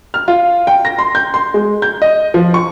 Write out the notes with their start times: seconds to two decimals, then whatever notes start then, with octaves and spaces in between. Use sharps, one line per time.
0.14 F6
0.28 F4
0.67 G5
0.85 A#6
0.99 C6
1.15 G6
1.34 C6
1.54 G#3
1.82 G6
2.02 D#5
2.34 F3
2.54 C#6